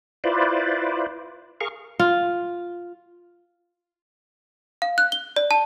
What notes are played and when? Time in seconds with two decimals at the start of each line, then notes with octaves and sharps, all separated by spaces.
0.24 E4 F4 B4 C5 D5
1.61 G#4 A#4 F5 C#6
1.99 F4
4.82 F5
4.98 F#6
5.12 G7
5.36 D5
5.51 A5